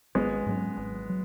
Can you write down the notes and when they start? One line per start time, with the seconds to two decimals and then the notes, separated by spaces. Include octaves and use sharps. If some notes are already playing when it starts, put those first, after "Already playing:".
0.15 G#1 G#3 B3
0.46 G#2 F#3 C#4
0.77 G#1
1.09 F#3